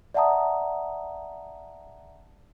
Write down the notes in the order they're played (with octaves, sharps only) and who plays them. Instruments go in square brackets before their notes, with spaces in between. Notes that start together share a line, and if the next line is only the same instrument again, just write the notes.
[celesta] D5 E5 F#5 A5 A#5 D#6